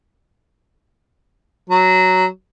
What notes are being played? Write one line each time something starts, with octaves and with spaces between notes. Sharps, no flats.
F#3